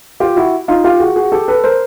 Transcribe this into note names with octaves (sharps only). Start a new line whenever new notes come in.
F4 G4
E4 F#4
D#4 F4
F4 G4
F#4 G#4
F#4 G#4
G4 A4
A4 B4
A#4 C5